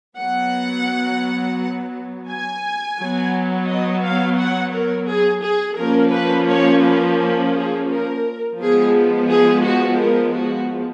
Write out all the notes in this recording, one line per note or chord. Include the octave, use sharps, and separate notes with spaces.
F#3 B3 F#5
G#5
F#3 B3
D#5
F5
F#5
A#4
G#4
G#4
F3 A#3 C#4 A#4
B4
C#5
B4
A#4
G#4
A#4
F3 G#3 B3 G#4
G#4
F#4
A#4
F#4